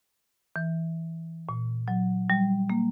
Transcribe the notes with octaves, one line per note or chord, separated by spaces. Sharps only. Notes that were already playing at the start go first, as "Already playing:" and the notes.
E3
A#2
F#3
G3
A#3